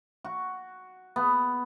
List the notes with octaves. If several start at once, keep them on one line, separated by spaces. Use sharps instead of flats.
F#4
B3